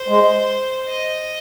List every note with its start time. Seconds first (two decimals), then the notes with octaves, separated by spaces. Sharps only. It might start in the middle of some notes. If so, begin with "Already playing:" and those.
Already playing: C5
0.08 G#3
0.88 D#5